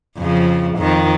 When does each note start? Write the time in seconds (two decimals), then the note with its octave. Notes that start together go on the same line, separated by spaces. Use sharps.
0.18 F2 C#3 F3
0.77 F2 D#3